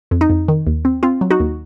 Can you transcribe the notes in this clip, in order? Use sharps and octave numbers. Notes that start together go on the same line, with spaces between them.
F2
D#4
F2
D#3
D#2
C4
C4 F4
F#3
D#4 F#4
D#2